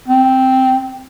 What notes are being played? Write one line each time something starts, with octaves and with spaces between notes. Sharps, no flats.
C4